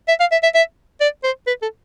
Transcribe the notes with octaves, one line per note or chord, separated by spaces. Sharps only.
E5
F5
E5
E5
E5
D5
C5
B4
A4